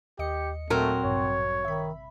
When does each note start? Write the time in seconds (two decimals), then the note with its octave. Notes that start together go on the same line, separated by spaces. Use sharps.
0.19 D#2 G4 D#5 C#7
0.70 A#2 F#3 A3 C4 A#4
1.04 A1 G2 C3 C#5
1.64 D#3 E5 B5